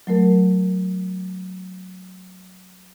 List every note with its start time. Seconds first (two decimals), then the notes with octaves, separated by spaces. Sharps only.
0.07 F#3 A3 A#4